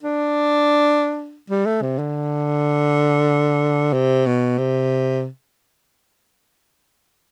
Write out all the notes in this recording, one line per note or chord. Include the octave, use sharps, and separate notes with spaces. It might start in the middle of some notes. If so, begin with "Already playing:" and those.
D4
G3
A3
C3
D3
C3
B2
C3